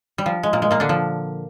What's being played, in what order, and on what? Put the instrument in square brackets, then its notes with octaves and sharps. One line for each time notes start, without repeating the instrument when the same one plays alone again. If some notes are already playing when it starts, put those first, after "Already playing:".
[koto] G3
F3
G#3
A#2 A#3
G#3
A#2 A#3
D3 D4
F3